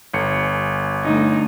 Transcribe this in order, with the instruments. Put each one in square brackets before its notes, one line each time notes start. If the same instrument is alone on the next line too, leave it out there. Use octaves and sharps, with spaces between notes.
[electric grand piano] G1 C#7
[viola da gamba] D3 A3 D#4